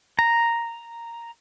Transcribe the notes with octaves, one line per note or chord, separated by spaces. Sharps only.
A#5